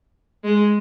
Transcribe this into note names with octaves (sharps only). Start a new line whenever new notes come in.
G#3